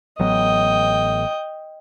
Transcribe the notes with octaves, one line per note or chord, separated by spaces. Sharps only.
A1 F#3 B3 D#5 G5